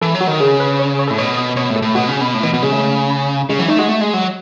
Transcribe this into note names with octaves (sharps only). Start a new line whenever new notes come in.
E3 A4
F#3
F#4
D#3
C#3 G#4
B4
C#5
C#5
A2 A4
B2 C#5
D#5
B2 C#5
A2
A4
A2
B2 F#4
C#3
B2
A2
B2 E3
B2 F#3
C#3 G#3
A3
C#3 G#3
E3 F#3
A3 D#4
G#3 F#4
A3
G#3
F#3